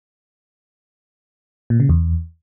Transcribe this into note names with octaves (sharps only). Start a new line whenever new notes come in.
A#2
C#3
E2